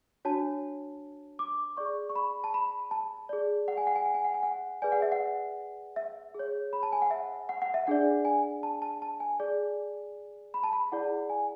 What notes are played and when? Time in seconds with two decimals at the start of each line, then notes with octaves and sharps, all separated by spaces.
0.25 D4 F#4 C#5 A5
1.39 D6
1.77 G#4 D5 C#6
2.10 C#6
2.16 B5
2.44 A5
2.54 B5
2.91 A5
3.29 G#4 D5
3.68 F#5
3.77 G#5
3.87 F#5
3.96 G#5
4.06 F#5
4.14 G#5
4.24 F#5
4.34 G#5
4.43 F#5
4.82 G#4 B4 D5 G#5
4.92 F#5
5.02 E5
5.12 F#5
5.96 E5
6.35 G#4 C#5
6.73 B5
6.83 A5
6.92 G#5
7.02 F#5
7.11 E5
7.49 F#5
7.62 F#5
7.74 E5
7.87 D4 G#4 D5 F#5
8.25 G#5
8.63 A5
8.82 A5
9.02 A5
9.20 G#5
9.40 G#4 D5
10.54 B5
10.64 A5
10.73 B5
10.92 E4 G#4 D5 F#5
11.29 G#5